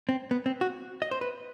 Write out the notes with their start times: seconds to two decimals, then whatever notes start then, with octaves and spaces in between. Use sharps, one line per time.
0.09 C4
0.31 B3
0.46 C4
0.61 F#4
1.02 D#5
1.11 C5
1.21 B4